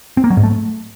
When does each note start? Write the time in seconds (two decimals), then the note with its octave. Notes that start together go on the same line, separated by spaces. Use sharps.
0.17 C4
0.24 A#3
0.30 F#3
0.37 G#2
0.43 A3